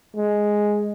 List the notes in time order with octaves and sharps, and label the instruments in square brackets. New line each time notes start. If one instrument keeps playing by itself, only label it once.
[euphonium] G#3